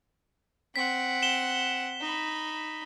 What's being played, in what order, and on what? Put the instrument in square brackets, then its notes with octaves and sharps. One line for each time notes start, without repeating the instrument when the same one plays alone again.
[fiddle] C4 F#5 [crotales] B6
[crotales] E7 G7
[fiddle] D#4 B5